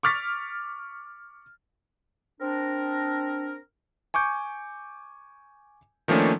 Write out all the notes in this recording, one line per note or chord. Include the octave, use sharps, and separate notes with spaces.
C#6 D6 F6 A6 B6
C4 D4 A#4
G#5 C#6 D6 G6
D#3 F3 A3 A#3 C#4 D4